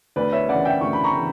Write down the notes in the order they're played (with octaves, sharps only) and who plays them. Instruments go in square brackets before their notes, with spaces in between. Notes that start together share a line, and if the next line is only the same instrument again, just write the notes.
[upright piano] D2 B4 D5
C#5 E5
C#3 E3 D5 F#5
E5 G5
D2 C#6
B5
A#5 C#6
C#3 E3